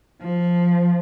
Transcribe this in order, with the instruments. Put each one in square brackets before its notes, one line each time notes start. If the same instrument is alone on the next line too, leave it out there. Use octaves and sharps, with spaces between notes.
[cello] F3